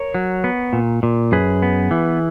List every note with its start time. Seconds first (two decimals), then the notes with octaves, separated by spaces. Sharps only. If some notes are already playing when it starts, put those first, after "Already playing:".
Already playing: A#4 C#5
0.14 F#3
0.44 B3
0.73 A#2
1.03 A#2
1.32 F#2 G#4 B4
1.62 B3
1.91 E3